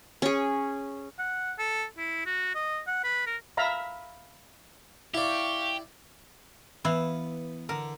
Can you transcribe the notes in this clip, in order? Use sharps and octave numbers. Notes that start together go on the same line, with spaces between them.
C#4 G#4
F#5
A4
E4
F#4
D#5
F#5
B4
A#4
E5 F5 A#5 B5
E4 G4 D5 F5 C#6
E3 B3 E4 F5
D3 A#4